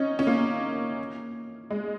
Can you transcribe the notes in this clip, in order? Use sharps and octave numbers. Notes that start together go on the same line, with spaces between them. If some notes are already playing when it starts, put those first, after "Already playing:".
Already playing: C#4 D#4
C#4
A#3
G#3